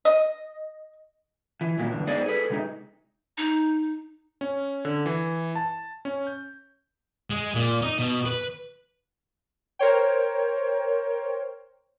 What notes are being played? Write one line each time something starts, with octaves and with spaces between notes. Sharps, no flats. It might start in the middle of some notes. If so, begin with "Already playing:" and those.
D#5
E3
A#2 F#3 G3 A#3
E2 G2 D3
G#3 B3 D#4 G#4 C5 D5
G#4 A4 B4
C3 G#3 B3 D#4
D#4
C#4
D3
E3
A5
C#4
G6
G#3
A#2
D#4
B2
B4
A#4 C5 C#5 G5